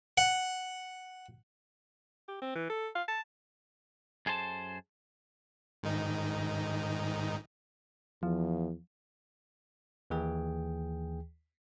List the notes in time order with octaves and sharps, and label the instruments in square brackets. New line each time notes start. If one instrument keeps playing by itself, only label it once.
[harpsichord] F#5
[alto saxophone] G4
C4
E3
A4
F5
A5
[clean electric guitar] F#2 G#4 A4 C5 A5
[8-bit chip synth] G#2 D#3 D#4
[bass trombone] E2 [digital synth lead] F3
[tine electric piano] D#2 E3 G#4 G5